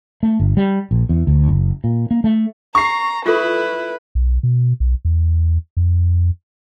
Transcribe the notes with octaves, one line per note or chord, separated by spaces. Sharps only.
A3
G1
G3
A#1
E2
D2
F#1
A#2
A#3
A3
A#5 C#6 C7
E4 F4 A4 B4
B1
B2
B1
E2
F2